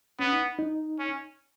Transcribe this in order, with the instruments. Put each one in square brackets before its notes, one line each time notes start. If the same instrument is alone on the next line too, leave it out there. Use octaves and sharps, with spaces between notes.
[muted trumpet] B3 [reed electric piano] C#4
[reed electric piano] D#4
D#4
[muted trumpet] C#4